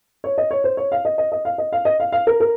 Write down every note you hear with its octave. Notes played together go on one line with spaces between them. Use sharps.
C#5
D#5
C#5
C5
C#5
F5
D#5
D#5
D#5
F5
D#5
F5
D#5
F5
F5
A#4
A#4